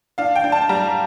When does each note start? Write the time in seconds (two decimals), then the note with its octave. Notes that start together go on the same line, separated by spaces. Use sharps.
0.18 D4 F5
0.35 G5
0.44 D4
0.52 A5
0.69 G3 A#5